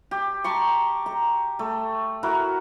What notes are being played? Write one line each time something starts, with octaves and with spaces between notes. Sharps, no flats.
G4
A5 A#5 C6 C#6
A#5
A3
E4 F#4 A#4